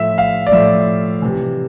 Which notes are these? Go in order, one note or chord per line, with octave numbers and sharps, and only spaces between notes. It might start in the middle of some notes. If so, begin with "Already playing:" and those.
Already playing: A2 F3 E5
F5
D5
A2 F3 E5
C3 E3